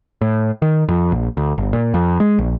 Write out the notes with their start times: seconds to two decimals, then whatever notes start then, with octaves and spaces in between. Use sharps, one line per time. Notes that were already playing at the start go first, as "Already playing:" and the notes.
0.21 A2
0.62 D#3
0.89 F2
1.12 A#1
1.37 D2
1.58 G1
1.73 A#2
1.94 F2
2.20 G#3
2.39 A#1